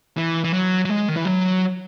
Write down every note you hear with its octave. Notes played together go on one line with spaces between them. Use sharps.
E3
E3
F#3
F#3
G#3
D#3
E3
F#3